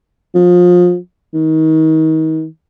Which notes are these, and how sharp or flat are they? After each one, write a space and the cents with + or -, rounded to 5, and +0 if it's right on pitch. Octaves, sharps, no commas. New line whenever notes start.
F3 +25
D#3 +35